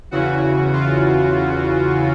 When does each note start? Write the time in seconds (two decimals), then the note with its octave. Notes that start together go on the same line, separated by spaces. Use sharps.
0.11 E2 C#3 E3 F#4
0.73 F4